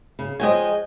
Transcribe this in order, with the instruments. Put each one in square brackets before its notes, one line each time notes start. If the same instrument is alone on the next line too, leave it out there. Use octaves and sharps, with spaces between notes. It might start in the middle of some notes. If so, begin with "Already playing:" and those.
[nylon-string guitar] C#3
[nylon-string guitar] F3 G#3 C#5 [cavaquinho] D#5 G5 G#5